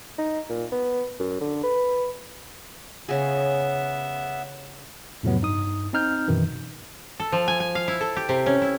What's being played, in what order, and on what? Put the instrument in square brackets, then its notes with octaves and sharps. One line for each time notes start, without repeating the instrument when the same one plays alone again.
[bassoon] D#4
A#2
B3
F#2
D3
B4
[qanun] C#3 G#4 [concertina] B3 E5
[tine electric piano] F2 A2 C3 F#3 B3
G2 D#4 D#6
C4 D#4 F6 G6
F#2 B2 D#3 E3
[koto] A4
F3
G#5
G#5
F5
E4
A4
G4
C3
C#4
E4